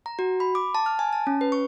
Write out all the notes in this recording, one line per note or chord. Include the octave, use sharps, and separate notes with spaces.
A#5
F#4
B5
D6
A5
F6
G#5
A5
C#4
B4
C#6